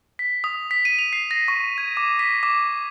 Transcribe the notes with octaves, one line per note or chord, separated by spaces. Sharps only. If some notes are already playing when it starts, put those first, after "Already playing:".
B6
D#6
B6
D#7
F7
C7
A#6
C#6
G#6
D6
B6
D6